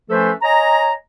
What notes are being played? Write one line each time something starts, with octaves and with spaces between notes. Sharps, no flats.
F3 A3 C#4 A4 B4 C5
C#5 D#5 G#5 A#5